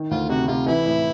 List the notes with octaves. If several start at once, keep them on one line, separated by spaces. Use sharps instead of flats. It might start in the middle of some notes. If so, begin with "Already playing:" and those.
Already playing: D#3
D2 F4
C3 F#4
C3 F4
E3 E4
A2